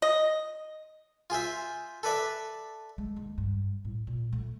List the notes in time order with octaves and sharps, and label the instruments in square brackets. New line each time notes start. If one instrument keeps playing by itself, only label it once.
[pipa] D#5
[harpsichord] F4 G#4 C5 E5
A4 B4 D5 E5
[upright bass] G#3
D#2
G2
A2
A#2
A3